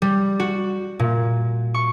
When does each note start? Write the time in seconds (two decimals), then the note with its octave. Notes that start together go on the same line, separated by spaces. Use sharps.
0.02 G3
0.40 F#4
0.99 A#2
1.74 C#6